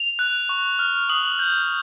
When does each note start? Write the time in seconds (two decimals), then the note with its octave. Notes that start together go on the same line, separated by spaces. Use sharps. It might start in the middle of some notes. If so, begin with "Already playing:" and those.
Already playing: F7
0.19 F#6
0.49 C#6
0.79 F6
1.09 D#6 F#7
1.39 G6